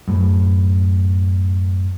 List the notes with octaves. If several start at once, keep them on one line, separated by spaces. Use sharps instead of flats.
F#2 A2